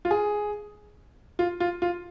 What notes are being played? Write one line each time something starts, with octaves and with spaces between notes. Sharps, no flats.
F4
G#4
F4
F4
F4